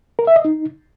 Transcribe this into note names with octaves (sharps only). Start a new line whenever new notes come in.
A#4
E5
D#5
D#4